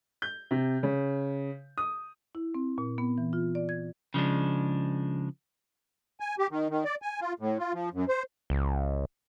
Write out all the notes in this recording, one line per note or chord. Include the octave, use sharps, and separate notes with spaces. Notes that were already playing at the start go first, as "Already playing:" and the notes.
G6
C3
C#3
D#6
E4
C4
A#2
B3
E3
F4
D5
G#6
C#3 F3 G#3 D4
G#5
G4
D#3
D#3
D5
G#5
F4
A2
F4
F3
F#2
C5
C#2